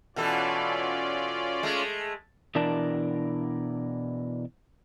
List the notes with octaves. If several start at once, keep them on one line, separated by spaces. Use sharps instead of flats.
B2 E3 C#4 F4 A4 D5
G#3 A3
B2 E3 D4 A#4 D5 A5